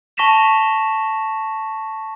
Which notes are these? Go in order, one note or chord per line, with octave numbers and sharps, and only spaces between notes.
A5 C#6 A#6 B6 E7 F7